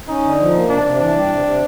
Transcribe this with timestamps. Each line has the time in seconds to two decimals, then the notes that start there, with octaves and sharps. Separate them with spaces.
0.08 C#4 D#4
0.23 D3
0.39 F3
0.54 A#3
0.69 C3 D4
0.85 C3
1.00 E3 D4
1.15 G3
1.30 C3
1.46 C3